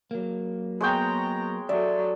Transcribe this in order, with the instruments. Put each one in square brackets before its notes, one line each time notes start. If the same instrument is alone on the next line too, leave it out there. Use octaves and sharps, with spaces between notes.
[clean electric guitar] F#3 A#3
[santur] G#3 C#5 G5 [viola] B3 A#5
[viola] F#3 A4 [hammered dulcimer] D5 [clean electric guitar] E5